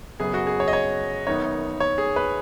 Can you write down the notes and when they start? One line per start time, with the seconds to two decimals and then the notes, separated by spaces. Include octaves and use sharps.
0.20 F#1 F#2 C#3 F#3 B3 G#4
0.34 F#4
0.47 G#4
0.60 C#5
0.68 D#5
0.73 C#5
1.27 F#1 F#2 D#3 B3 D#4 C#5
1.80 C#5
1.98 G#4
2.16 B4